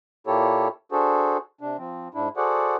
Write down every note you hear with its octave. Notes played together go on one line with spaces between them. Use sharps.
A#2 A#3 E4 G4 A4 C#5
D4 F#4 G#4 A4 C5
C3 D4
F3 C4
G#2 D4 E4
F#4 G#4 A4 C5 D5 F#5